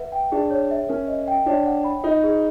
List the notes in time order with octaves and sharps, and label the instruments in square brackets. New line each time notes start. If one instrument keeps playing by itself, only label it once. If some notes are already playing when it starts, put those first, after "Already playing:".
Already playing: [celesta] B4 E5 F#5
G5
[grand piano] D4 [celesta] G#4
[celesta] C#5
E5
[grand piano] C#4 [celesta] A#4
[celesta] D#5
G5
[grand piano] D4 [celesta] C#5
[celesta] F#5
B5
[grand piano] D#4 [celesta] F4
[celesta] G#4